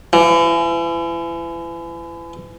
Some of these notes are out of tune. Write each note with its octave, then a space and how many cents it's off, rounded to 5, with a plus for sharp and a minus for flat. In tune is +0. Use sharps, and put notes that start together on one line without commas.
E3 +35